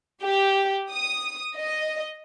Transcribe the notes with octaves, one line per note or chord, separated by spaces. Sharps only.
G4
D#6
D#5